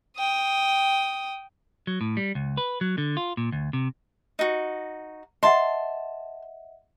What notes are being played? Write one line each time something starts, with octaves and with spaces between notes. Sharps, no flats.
G5 D#6
F#3
A2
G3
C#2
B4
F#3
D3
F4
A#2
D2
C3
D#4 F#4
D#5 E5 F#5 A5 C6